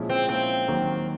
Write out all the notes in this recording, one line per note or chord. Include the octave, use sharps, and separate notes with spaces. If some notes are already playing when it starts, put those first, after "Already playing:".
Already playing: A#2 F3 G#3 C#4 E4
C4
A#2 F3 G#3 C4 C#4 E4
D#2 D#3 F#3 A#3